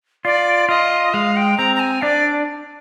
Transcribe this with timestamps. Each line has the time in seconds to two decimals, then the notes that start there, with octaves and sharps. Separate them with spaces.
0.25 F4 D5
0.69 F4 D#5
1.14 G#3 F5
1.36 G5
1.58 C4 A#5
1.76 A#5
1.80 G#5
2.02 D4 D5